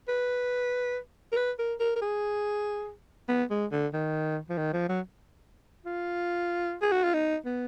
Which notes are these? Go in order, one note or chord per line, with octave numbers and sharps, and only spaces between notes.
B4
A#4
B4
A#4
A#4
A#4
G#4
B3
G#3
D3
D#3
F3
D#3
F3
F#3
F4
G#4
F#4
F4
D#4
B3